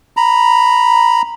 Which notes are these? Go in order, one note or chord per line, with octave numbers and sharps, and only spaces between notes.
A#5 B5